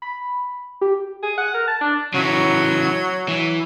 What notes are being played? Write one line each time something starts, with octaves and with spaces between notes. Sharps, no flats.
B5
G4
G#4
F#5
A#4
A5
D4
C#3 E3 F#3
E3